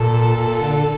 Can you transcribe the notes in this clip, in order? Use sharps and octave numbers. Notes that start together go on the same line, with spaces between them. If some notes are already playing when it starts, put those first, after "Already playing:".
Already playing: A#2 A4
A#2
D3